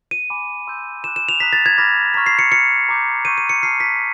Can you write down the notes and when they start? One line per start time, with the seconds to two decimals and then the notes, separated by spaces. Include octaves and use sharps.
0.11 D#7
0.30 G#5 B5 D6
0.67 C6 E6 G6
1.03 B5 D6 F#6 E7
1.16 E7
1.29 F7
1.40 A#5 D#6 F#6 B6
1.53 A6
1.66 G#6
1.78 B5 D6 F6 A#6
2.14 A#5 C#6 F6 B6
2.26 C7
2.39 C#7
2.52 C#6 F6 C#7
2.89 A#5 D6 G6
3.25 C#6 E6 G6 D#7
3.38 D#7
3.49 C#7
3.62 A5 D6 F6 C7
3.80 B6